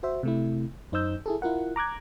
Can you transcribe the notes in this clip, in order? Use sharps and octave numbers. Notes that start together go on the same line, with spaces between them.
F#4 C5 E5
C3 A3 E4
F#2 D#4 C5 D#5 E6 G6
E4 G#4 A4
E4 F4 A#4 F#5
A#5 D6 F#6 G#6